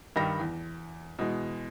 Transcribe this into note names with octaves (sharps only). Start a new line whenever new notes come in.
G2 D#3 G3 G5 A#6
E2
B2 E3 G#3